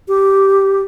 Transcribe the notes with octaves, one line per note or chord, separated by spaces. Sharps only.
G4